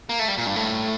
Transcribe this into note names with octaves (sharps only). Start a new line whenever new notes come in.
A#3
A3
G3
A#2
G2
A2